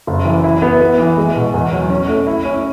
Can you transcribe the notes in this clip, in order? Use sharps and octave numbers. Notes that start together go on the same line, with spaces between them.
F#1
E3
E4
B3
B3
E3
G#3
B2
E2
F#3
C#4
A3
E4
C#4